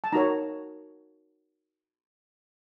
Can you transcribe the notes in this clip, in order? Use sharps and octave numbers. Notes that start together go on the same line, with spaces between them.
A5
D#4 F#4 A#4 C#5 A#5